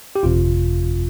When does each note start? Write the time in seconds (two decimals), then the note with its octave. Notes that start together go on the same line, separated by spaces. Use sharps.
0.16 G4
0.23 G1 F2 C3 F4